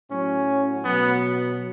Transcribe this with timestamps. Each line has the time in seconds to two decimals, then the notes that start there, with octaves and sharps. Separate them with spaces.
0.10 A2 F#3 C#4
0.85 B2 F#3 B3